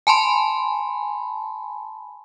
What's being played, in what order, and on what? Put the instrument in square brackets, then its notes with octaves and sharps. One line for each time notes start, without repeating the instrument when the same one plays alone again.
[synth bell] G#5 A5 B5 C6